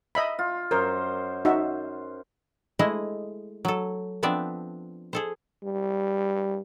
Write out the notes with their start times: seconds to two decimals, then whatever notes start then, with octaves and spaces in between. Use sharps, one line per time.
0.15 D#5 E5 B5
0.39 F4
0.71 F#2 A#4 C5
1.45 D#4 F#4 E5
2.79 G#3 A3 E4 C5 D#5
3.65 F#3 A4
4.23 F3 B3 C4 D4 D5 E5
5.13 G#4 A4 C5
5.63 G3